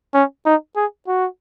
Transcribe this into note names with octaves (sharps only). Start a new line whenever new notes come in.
C#4
D#4
G#4
F#4